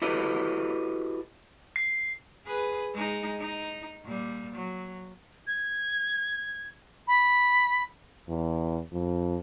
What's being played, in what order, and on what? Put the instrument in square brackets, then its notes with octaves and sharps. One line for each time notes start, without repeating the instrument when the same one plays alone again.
[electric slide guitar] E4 F#4 G4 A4 B4 D#5
[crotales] C7
[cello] G#4 B4
G#3 D#4
D#4
A#2 G3
F#3
[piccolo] G#6
B5
[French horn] E2
F2